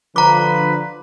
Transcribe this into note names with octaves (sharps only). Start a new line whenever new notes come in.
D3 F3 B4 A#5 D6